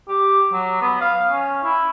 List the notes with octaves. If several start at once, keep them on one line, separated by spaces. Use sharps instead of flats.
G4
F#3
B3
F5
C#4
E4